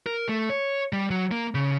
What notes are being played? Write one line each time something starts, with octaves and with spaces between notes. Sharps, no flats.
A#4
A3
C#5
G3
F#3
A#3
C#3